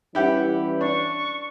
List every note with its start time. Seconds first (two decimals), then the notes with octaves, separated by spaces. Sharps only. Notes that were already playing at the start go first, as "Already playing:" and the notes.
0.15 E3 G3 C#4 E4 G4 F#5
0.81 D4 C#6